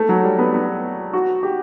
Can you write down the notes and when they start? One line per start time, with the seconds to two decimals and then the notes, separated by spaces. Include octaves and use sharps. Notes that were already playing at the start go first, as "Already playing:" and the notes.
Already playing: A3
0.09 F#3
0.24 G3
0.39 B3
0.54 B3
1.13 F#4
1.43 G4